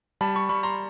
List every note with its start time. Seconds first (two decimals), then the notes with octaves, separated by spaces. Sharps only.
0.21 G3 A5 B5
0.35 B5 C#6
0.49 G3 B5 C#6
0.63 A#5 C6